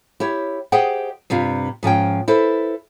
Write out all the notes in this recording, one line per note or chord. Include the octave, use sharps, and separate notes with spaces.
E4 G4 C#5
G4 G#4 C5 D#5 F#5 G5
G2 C3 D4 F4
G#2 F3 C#4 G5
E4 A4 B4 C5